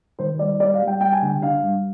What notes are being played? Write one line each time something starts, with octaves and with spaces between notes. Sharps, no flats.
D#3 C5
G3 D5
G3 D5
F5
G3
G5
G3 G5
G#5
D3 G5
D4 F5
G2